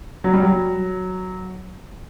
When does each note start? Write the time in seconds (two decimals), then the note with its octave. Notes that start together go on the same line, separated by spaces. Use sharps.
0.24 F#3
0.33 G3
0.42 F#3